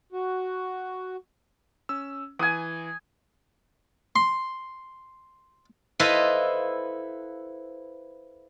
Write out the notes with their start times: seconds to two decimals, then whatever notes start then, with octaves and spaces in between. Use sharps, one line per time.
0.12 F#4
1.89 C#4 E6
2.39 E3 G#5 D#6
4.16 C6
6.00 E4 A4 B4 C5 D#5 F5